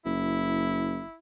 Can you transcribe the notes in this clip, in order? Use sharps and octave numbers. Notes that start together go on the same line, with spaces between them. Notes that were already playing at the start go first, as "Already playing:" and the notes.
F#1 E4